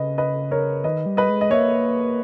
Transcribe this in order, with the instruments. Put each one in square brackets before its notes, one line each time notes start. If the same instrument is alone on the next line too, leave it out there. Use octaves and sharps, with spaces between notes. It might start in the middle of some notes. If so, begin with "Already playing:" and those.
Already playing: [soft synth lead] C#3 [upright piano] B4 D#5
[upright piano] B4 D#5
A#4 C#5
[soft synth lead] D#3 [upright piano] B4 D#5
[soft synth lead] G3
[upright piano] B4 D#5
[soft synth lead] G#3
[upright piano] D#5
[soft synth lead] A#3 [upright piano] C#5 E5